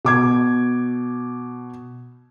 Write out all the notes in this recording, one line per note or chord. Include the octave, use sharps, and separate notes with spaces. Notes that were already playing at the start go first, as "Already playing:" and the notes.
B2 D6 G#6